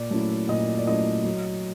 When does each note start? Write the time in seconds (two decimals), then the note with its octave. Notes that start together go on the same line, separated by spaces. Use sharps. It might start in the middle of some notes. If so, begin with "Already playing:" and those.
Already playing: A#2 D5
0.11 F#3 A3 C#4 E4
0.49 A#2 D#5
0.77 D5
0.87 F#3 A3 C#4 E4 D#5
1.25 F#3